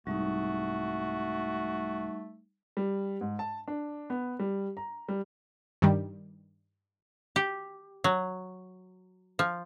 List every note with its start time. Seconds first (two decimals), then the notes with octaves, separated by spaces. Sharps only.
0.07 C2 G#2 G3 A3 D#4 F#4
2.77 G3
3.21 G#2
3.39 A5
3.68 D4
4.10 B3
4.39 G3
4.77 A#5
5.09 G3
5.82 G2 D#3 G3
7.36 G4
8.04 F#3
9.39 F3